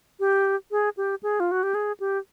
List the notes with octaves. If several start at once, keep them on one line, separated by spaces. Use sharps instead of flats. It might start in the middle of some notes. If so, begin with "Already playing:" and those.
G4
G#4
G4
G#4
F4
F#4
G4
G#4
G4